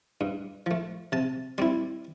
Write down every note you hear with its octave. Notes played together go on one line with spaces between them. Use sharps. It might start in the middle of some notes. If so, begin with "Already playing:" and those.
G2
F3 A3
C3 A5
G3 C4 E4 C6